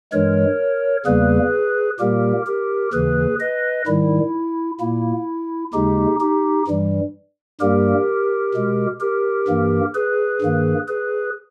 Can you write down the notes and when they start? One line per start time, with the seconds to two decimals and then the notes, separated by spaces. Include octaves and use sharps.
0.12 G2 E3 G#3 A#4 C#5
1.06 E2 C#3 G3 A#3 G#4 B4
2.00 A#2 G3 A#3 G4 A#4
2.47 G4 A#4
2.93 D#2 C#3 E3 G#4 B4
3.40 B4 D#5
3.87 G#2 D#3 G3 E4
4.80 A#2 A#3 E4
5.74 D#2 C#3 G#3 D#4 G4
6.20 D#4 G4
6.67 G2 E3 G3
7.60 G2 G3 A#3 G4 A#4
8.54 B2 G#3
9.01 G4 A#4
9.48 G2 E3 A#3
9.95 G#4 B4
10.41 G2 D#3 A#3
10.88 G#4 B4